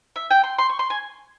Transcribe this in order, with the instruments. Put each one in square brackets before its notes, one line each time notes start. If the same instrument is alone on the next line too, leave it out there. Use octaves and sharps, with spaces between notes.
[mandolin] E5
G5
C6
C6
C#6
C6
G#5